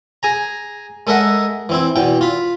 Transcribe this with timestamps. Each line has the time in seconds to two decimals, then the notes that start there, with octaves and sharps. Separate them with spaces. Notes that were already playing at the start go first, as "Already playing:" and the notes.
0.23 G#4 G#5 A#5
1.07 G#3 A4 A#4 D#5 E5 F#5
1.69 E3 C4 E4
1.96 E2 B2 E3 G5
2.21 F4 B5